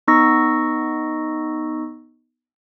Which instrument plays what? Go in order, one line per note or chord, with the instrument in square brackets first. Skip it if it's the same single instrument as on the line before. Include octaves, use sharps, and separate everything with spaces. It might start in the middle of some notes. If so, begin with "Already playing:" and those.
[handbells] B3 D#4 D#5 C#6 E6 A#6